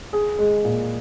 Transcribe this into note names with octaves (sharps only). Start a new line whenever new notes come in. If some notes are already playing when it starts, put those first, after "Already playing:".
G#4
G#3
A#2